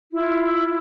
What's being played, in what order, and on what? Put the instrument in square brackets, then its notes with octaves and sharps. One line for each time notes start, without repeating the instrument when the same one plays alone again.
[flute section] E4 F4